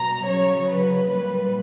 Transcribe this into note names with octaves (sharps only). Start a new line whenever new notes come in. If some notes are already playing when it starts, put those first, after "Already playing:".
Already playing: B2 G3 A#5
C#3 F#3 C#5
B4
A#2 G3 B4